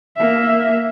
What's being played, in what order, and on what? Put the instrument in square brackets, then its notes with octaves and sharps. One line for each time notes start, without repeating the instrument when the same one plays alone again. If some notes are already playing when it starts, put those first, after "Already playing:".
[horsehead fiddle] A#3 E5